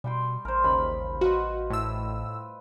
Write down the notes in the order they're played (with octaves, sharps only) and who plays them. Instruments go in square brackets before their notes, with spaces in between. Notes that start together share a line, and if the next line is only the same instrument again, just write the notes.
[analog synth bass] B2 [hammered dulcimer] G3 G5 C6
[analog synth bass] A1 [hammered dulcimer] A#4 C5
[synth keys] D#2 C#3 [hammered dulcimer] B5
[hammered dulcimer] F4 B4 D#5 [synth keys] F#4
[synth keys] A2 E6